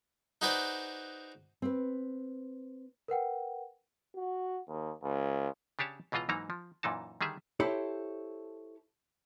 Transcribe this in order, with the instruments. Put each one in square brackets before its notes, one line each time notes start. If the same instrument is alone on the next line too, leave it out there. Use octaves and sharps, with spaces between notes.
[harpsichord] D#4 F#4 G#4 B4 C5 D5
[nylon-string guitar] C4 B4
[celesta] A#4 B4 F#5 G5
[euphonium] F#4
D#2
C#2
[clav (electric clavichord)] C#3 D4 G4 C#5 A5
C#2 B2 E3 F4 D#5 A#5
G#2 E3 F#3 A#3 D#4 A#5
F3
F#2 A#2 E3 D#4 A5
D3 D#3 G3 G#4 E5
[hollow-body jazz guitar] E4 G4 A4 C5 C#5